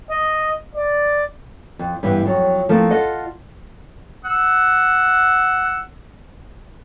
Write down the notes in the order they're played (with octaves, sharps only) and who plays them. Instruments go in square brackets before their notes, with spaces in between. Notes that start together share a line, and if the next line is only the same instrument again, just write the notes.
[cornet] D#5
D5
[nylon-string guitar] F2
G2 E3 B3 F4 G4
F2 F#3
F3 A3 A#3 C4
F4 A4 D#5 F#5
[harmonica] F#5 E6